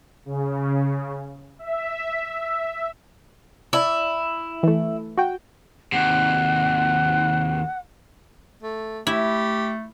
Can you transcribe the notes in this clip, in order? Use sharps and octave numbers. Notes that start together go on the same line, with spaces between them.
C#3
E5
E4 D5
E3 A3
F#4 G5
D#2 C3 F#5
A3
A3 E4 G4